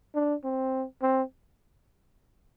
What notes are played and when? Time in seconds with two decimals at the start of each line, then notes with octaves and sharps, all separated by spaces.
0.15 D4
0.44 C4
1.02 C4